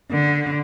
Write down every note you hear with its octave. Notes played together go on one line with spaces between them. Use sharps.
D3